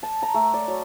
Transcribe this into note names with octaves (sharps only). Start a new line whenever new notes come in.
A5
A#5
A3
D5
F#3